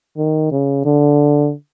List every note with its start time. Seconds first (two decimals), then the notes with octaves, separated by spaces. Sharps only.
0.17 D#3
0.52 C#3
0.85 D3